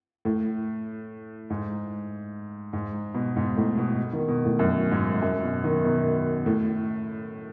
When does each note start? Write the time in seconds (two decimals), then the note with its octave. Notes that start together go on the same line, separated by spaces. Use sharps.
0.25 A2
1.50 G#2
2.73 G#2
3.14 B2
3.36 G#2
3.57 A2
3.77 B2
4.13 D#3
4.28 B2
4.45 A2
4.59 F#2
4.91 G#2
5.22 F#2
5.43 B2
5.64 D#3
5.85 B2
6.46 A2